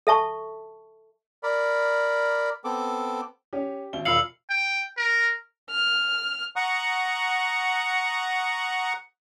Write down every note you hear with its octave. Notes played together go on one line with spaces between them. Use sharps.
A4 E5 A5 C#6
A#4 D5 B5
B3 C4 A4 D6
C#4 G4
G#1 G7
E1 F4 F5 B5 E6 C#7 F#7
G5
A#4
F6
F#5 A#5 C#6 D#6 F#6